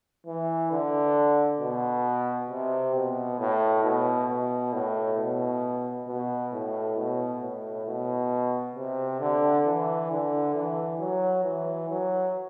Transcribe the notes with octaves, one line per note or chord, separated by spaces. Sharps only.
E3
D3
B2
C3
B2
A2
B2
B2
A2
B2
B2
A2
B2
A2
B2
C3
D3
E3
D3
E3
F#3
E3
F#3